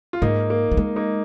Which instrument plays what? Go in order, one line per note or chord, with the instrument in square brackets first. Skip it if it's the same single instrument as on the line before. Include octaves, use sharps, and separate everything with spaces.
[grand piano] F4
[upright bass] G#2 [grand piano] A#3 D#4
[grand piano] A#3
[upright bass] F3
[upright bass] G#3 [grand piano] A#3
[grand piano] A#3 D#4